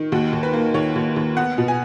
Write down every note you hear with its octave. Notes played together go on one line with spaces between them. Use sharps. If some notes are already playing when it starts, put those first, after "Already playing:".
Already playing: D#3
D#2 F#4
D#2
B4
A#3
D#2 C#5
D#2
D#2
B3 F#5
B2
G#5